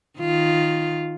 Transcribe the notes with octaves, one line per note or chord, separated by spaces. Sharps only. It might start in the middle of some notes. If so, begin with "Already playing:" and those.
D#3 F4